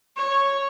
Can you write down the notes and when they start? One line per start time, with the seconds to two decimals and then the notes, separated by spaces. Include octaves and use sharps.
0.16 C#5